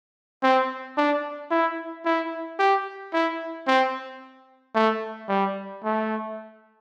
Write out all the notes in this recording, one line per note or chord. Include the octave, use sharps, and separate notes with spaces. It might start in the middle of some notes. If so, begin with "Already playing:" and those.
C4
D4
E4
E4
G4
E4
C4
A3
G3
A3